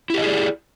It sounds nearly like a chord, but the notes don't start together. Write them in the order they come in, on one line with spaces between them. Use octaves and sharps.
E4 G4 D#5 G#4 D5